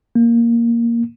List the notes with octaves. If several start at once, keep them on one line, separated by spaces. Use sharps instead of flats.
A#3